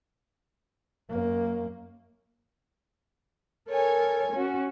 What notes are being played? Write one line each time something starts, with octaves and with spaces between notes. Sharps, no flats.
F#2 A#3
A4 A#4 C#5 G#5
C#4 F#4